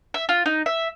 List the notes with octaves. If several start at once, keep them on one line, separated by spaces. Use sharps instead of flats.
E5
F4
D#4
E5